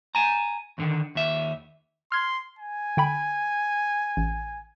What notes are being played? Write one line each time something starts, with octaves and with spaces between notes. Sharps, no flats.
G#5 A#5
D#2 D3 D#3
D#2 E5
C6 F6 G#6
G#5
D3 G5 B5
A1